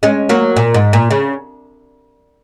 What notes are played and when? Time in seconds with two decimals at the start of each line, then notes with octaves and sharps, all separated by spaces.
0.03 G#3 C#4
0.29 F#3 A#3
0.56 A#2
0.74 G#2
0.93 A#2
1.10 C#3